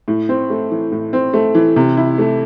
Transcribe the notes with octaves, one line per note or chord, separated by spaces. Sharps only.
A2
C4
A3
E3
A2
C4
A3
E3
C3
E4
A3